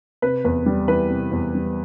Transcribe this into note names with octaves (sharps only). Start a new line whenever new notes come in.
C3 B4
E2 B4
G3
E3 B4
C3
E2
G3